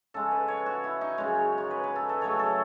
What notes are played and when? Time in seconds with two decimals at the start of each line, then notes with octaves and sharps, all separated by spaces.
0.14 C#3 G#3 A4
0.32 B4
0.48 C#5
0.66 F#4
0.84 E4
1.01 D#4
1.18 F#2 C#3 G#3 C#5
1.58 C#5
1.71 B4
1.84 B4
1.96 A4
2.09 A4
2.21 C#3 F#3 A3 C#5
2.39 A4